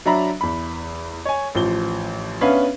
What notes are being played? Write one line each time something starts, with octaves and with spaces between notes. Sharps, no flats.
F#3 D4 E5 A#5 B5
E2 B5
C#5 G#5
A1 F3 G7
B3 C#4 D4 B4 E5 F5